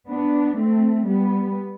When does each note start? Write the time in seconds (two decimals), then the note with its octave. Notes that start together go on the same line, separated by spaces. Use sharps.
0.09 B3 D4
0.57 A3 C4
1.06 G3 B3